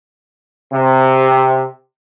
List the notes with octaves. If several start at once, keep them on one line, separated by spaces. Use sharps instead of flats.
C3